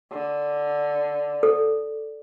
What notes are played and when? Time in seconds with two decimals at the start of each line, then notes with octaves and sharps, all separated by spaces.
0.12 D3
1.43 A4